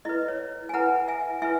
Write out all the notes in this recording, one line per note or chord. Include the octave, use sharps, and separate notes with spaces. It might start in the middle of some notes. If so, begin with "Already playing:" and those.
E4 B4 D#5
C#5
G#5
E4 B4 F#5 A#5
E5 G#5
E4 B4 E5 G#5